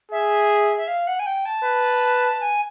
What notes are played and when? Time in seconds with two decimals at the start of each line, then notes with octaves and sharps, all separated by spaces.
0.11 G#4 E5
0.77 E5
0.87 F5
1.07 F#5
1.19 G#5
1.26 G5
1.45 A5
1.64 B4
2.40 G#5